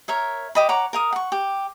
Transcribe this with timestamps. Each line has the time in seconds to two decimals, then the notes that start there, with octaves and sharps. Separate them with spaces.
0.08 A#4 C#5 E5
0.55 G4 D#5 B5
0.69 C#5 F#5 A#5 D6
0.93 A#4 F5 D#6
1.12 F#5 C#6
1.32 G4